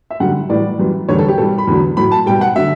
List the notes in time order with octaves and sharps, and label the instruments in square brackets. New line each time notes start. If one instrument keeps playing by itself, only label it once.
[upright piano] E5
F#2 D3 G3 F#5
A2 E3 G3 D5
F#2 E3 G3
E2 D3 G3 C#5
A4
G4
B2 G3 A4
B5
E2 D3 F#3
A2 F#3 B5
A5
B2 G3 G5
F#5
D3 F#3 E5